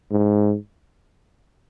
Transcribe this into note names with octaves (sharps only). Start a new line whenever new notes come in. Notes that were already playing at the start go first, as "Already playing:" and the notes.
G#2